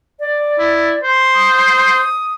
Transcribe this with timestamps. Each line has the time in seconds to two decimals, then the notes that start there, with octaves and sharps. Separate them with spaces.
0.20 D5
0.59 E4
1.03 C5
1.35 D#6